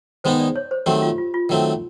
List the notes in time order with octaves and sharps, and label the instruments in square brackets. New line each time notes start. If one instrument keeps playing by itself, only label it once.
[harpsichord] D#3 G#3 B3 D#4 [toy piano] C5
[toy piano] D5
C#5
C5
[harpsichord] D#3 F#3 A3 C4 [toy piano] G4
[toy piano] F4
F4
F4
[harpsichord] D#3 F#3 A3 C4